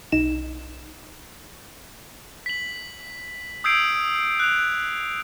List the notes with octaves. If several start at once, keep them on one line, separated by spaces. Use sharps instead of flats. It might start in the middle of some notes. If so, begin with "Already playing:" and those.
B1 D#4 E7
B6 F#7
D#6 E6 G6 G#6 C7 D7
F#6 F7